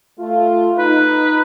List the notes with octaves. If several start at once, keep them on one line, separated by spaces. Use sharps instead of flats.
A3 F4
D#4 B4